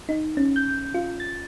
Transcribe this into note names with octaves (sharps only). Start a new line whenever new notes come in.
D#4
C#4
G6
F4
A6